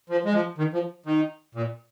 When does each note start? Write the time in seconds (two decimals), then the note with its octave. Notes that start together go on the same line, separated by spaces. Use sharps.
0.10 F3
0.25 G#3
0.34 F3
0.58 D#3
0.74 F3
1.06 D#3
1.55 A#2